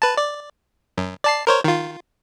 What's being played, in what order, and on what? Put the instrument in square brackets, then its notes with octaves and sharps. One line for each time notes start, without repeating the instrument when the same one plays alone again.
[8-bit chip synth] B4 A5
D5
F#2
D5 A5 C7
A#4 C5 C#5
D#3 F4